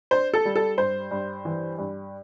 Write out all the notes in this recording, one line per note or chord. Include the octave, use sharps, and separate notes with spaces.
D4 C5
A4
G3
A4
G2 C5
G2
E3
G2